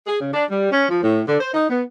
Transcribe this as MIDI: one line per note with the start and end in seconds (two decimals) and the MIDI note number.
0.07 0.16 68
0.20 0.30 49
0.33 0.43 62
0.49 0.67 55
0.71 0.85 61
0.89 1.00 53
1.02 1.21 45
1.26 1.37 50
1.41 1.49 72
1.54 1.67 63
1.69 1.83 59